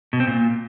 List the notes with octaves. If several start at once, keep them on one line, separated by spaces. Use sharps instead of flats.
B2
C4
A#2